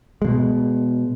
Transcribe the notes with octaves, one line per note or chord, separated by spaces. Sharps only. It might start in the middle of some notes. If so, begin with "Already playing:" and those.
B2 G#3